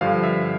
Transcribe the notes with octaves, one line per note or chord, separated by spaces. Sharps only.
G2 D3 F3 F5
E5